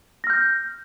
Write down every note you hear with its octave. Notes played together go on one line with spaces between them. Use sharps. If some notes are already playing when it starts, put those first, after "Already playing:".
F6 G6 A#6